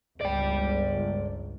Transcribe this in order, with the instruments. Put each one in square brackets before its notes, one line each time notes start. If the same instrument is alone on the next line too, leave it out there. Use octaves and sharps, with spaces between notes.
[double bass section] G1 C#2 [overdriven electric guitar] D5 G5